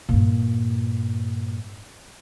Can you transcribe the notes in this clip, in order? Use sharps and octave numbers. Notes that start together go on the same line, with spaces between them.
G2 A#2